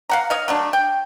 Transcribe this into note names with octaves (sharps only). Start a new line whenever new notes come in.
F5 F#5 A#5
C#5 D#5 F5
F#3 A3 D4
G5